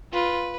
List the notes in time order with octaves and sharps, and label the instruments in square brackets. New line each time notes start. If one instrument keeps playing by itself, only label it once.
[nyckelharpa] F4 [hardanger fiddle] B4